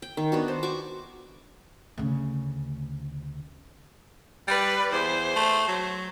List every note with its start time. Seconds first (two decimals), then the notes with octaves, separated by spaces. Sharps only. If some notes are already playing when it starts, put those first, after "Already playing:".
0.02 G5
0.17 D#3
0.32 B3 D4 F#4
0.48 C5
0.63 F#4 C#6 D6
1.98 D2 C#3
4.48 G3 B4 D5
4.92 E2 C5
5.36 A3
5.68 F#3